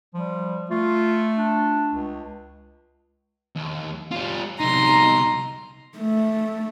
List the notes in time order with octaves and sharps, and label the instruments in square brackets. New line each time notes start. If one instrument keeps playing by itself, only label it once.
[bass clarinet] F3 [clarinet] G3
[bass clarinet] A3 [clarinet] F4
[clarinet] D4
[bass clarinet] C#2
[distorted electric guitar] D#2
G3 F4
[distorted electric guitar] C2 D#4 [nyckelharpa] A#5 C6
[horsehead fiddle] A3